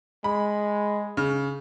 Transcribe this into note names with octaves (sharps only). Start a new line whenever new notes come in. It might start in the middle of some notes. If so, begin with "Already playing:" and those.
G#3 B5
C#3